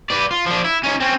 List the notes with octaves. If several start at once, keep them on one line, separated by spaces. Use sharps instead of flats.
B4 D5
F4
F3 D4
E4
C#4 D#4
C4 C#4